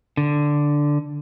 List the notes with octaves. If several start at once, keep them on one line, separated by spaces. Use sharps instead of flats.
D3